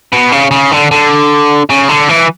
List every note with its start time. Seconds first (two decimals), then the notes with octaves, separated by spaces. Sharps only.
0.13 B2
0.32 C#3
0.51 C#3
0.72 D3
0.91 D3
1.70 C#3
1.89 D3
2.09 E3